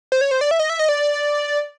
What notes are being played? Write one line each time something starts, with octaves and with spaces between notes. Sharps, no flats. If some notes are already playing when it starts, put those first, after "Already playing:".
C5
C#5
C5
D5
E5
D#5
E5
D#5
D5